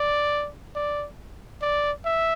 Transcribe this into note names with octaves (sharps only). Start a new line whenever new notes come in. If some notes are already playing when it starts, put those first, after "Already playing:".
Already playing: D5
D5
D5
E5